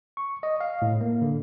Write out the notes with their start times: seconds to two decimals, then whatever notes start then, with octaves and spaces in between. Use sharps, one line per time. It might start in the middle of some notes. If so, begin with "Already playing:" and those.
0.17 C#6
0.43 D#5
0.61 F5
0.82 A2
1.01 A#3
1.22 D3